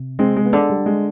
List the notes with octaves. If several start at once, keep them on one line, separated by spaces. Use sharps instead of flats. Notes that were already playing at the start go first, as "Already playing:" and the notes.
Already playing: C3
G#3 C4
G#3
B3
D3 G#3
G3
G#3